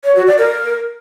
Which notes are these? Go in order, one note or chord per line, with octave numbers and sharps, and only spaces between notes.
C#5
F#4
D5
A#4